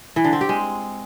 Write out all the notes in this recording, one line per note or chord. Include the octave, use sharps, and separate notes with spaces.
E3
D3
C4
G4
G#3